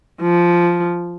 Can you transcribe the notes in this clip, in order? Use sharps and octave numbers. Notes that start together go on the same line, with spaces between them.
F3